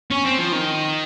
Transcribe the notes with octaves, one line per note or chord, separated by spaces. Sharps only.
C#4
C4
F3
D#3